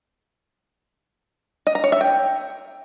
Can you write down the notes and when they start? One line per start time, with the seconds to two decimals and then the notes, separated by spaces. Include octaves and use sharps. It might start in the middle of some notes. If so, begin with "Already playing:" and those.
1.67 D#5
1.75 A#5
1.84 C#5
1.92 E5
2.01 G5